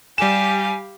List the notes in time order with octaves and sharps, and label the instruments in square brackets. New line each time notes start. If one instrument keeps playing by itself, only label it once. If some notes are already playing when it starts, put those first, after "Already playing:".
[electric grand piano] G3 E7 [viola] G4 F5 [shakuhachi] G#5